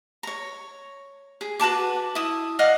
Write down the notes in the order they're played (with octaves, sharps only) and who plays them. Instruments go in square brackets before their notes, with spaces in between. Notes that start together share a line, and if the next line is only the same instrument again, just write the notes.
[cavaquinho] C#5 A#5
G#4
F#4 B4 A5 D6
E4 D#6
D5 D#5 F5 F#5